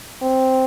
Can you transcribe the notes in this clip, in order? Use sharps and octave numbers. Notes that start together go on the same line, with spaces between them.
C4